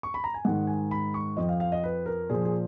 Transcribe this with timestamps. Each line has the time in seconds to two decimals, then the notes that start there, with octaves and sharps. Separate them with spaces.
0.03 C#6
0.14 B5
0.24 A#5
0.34 G#5
0.45 G#2 D#3 F#5
0.67 G#5
0.91 B5
1.14 C#6
1.37 F2 F3 D#5
1.49 F5
1.60 F5
1.72 D#5
1.84 B4
2.06 A#4
2.30 A#2 F3 G#4
2.45 G#4